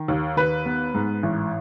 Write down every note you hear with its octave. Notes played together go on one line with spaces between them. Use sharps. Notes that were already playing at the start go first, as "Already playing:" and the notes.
Already playing: D#3
D#2
D#2 B4
B3
G#2
A1